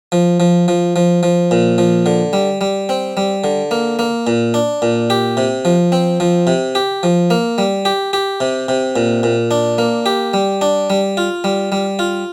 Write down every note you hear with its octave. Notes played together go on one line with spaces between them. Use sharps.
F3
F3
F3
F3
F3
A#2
F3
D3
G3
G3
C4
G3
D3
A#3
A#3
A#2
D4
A#2
G4
C3
F3
C4
F3
C3
G4
F3
A#3
G3
G4
G4
C3
C3
A#2
A#2
D4
A#3
G4
G3
D4
G3
F4
G3
G3
F4